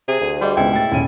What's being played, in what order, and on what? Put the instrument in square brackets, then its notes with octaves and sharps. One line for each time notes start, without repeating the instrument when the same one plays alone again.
[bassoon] C3 [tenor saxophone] G#4
[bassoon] D2
[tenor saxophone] G3 [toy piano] F#4 G#4 D#5
[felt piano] C#2 B2 [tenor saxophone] E4 [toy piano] D#5 G5
[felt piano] A2 A6 [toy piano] G5
[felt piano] D#1 C#4 D#7